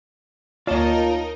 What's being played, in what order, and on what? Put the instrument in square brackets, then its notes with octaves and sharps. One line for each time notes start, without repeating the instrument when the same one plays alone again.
[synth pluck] D2 A#3 C#5 [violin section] D#4 A#4 D#5 [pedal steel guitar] F4 A5